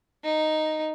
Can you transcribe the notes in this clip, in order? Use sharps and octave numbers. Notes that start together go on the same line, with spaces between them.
D#4